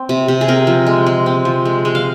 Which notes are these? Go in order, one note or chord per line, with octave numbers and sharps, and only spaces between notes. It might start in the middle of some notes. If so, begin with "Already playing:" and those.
Already playing: C4
C3
C3
G#4
C4 A#4
F3
G#3
G#3
C4
F3
G#3
G#3
F5